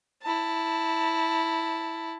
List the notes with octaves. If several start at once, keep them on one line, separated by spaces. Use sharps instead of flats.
E4 A5